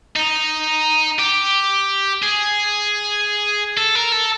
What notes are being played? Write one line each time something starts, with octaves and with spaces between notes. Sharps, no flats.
D#4
G4
G#4
A4
A#4
A4